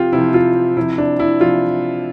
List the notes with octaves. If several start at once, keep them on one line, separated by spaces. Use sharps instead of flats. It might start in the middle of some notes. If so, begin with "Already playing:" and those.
Already playing: C3 F3 C4 F4 G4
C3 F3 E4
F4
C3 F3 E4
D4
E4
C3 F3 F4